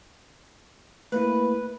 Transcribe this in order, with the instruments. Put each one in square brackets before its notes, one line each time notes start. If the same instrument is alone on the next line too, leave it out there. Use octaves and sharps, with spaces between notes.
[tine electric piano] A3 A#3 E4 [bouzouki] B4